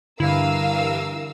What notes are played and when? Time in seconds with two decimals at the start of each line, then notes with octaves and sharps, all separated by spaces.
0.20 G2 D3 E3 E4 A#4 F5 E6 D#7